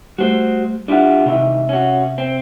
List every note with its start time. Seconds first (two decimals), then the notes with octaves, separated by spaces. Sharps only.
0.18 G3 A3 F#4 C5
0.88 G3 D4 E4 F4 F#5
1.26 G#2 C3 D#3 E3 E5
1.69 C#4 F#4
2.18 C4